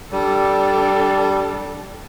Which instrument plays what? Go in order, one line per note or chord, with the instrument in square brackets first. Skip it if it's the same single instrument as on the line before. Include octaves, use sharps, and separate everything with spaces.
[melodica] G3 [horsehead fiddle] D4 A4